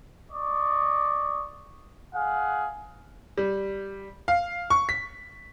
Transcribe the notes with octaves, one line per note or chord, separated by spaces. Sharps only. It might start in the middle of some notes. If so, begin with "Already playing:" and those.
D5 D#5 C#6
G#4 F5 F#5
G3
F5
C#6
B6